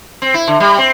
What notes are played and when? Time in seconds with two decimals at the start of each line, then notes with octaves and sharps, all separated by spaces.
0.22 C4
0.34 E4
0.48 D3
0.60 G3
0.78 C4